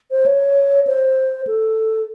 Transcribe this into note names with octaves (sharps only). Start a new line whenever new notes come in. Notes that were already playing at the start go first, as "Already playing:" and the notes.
C5
C#5
C5
A4